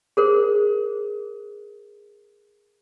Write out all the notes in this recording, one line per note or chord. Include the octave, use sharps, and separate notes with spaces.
G#4 A#4 C5